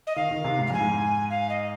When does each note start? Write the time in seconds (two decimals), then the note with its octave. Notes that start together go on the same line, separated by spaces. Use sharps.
0.07 D#5
0.16 D#3 F5
0.31 D#3
0.44 C3
0.58 G#2
0.67 F5
0.70 F2 G#5
0.81 G#2
1.30 F5
1.50 D#5